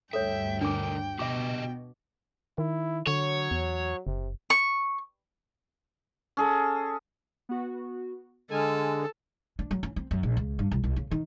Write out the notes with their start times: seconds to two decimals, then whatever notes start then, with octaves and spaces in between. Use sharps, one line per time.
0.13 D2 G2 A4 C#5 E5 G5
0.61 D3 D4 A#4 D6
1.19 B2 F#4 G4 D#5 E5 D6
2.58 D#3 E4
3.07 D3 F#3 C#5
3.51 E2
4.07 F#1 C3
4.50 C#6
6.37 C#4 G#4 A4
7.49 B3 F#4
8.51 D3 G#3 A4 G#5 F6
9.59 D4
9.71 F#3
9.83 C#4
9.96 C4
10.11 F#2
10.23 A#1
10.37 C#2
10.59 G2
10.71 C2
10.84 C2
10.96 C#3
11.11 D#3